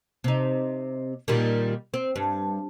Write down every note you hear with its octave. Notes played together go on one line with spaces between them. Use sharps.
C3 D#4
A#2 D#3 G3
C4
G2